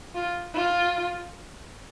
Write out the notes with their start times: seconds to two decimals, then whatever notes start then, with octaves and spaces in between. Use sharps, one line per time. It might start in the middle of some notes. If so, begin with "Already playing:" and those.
0.15 F4
0.55 F4